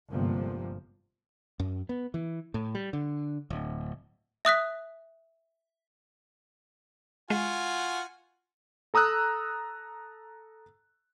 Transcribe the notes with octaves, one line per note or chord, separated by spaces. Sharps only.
G1 G#2 C3 F3 A#3
F#2
B3
E3
A2
G3
D3
D1
E5 D#6 F#6 B6
G#3 F4 F#4 F#5 G#5
A4 A#5 D#6 E6 F#6